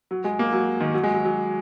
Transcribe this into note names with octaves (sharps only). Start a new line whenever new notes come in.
F#3
G#3
A#3
F#3
D#3
F#3
G#3
F#3
F#3